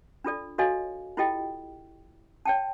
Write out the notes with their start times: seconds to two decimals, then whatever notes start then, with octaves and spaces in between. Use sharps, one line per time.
0.24 D4 F4 A4 D5
0.58 F#4 A4 C#5 D#5 F5 G#5
1.17 E4 F4 G4 A4 D#5 G5
2.45 C#5 G5 A5